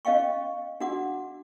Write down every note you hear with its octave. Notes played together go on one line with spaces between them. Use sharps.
C#4 D#5 F5 G5 C#6
D4 F#4 F#5 D6